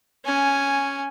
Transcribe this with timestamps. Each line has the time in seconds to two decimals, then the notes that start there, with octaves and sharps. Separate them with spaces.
0.25 C#4 G#5